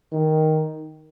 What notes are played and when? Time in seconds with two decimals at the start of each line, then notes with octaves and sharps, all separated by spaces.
0.12 D#3